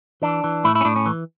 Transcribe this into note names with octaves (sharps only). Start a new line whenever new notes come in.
E3 D4
E3
A2 E4
E4
C#4
A2 D4
C#4
E3